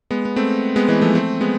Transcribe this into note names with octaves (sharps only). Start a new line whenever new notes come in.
G#3 B3
B3
A3 C4
G#3 B3
E3 G#3
F3 A3
A3 C4
G#3 B3